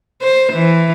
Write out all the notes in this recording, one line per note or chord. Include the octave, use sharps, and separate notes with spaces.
C5
E3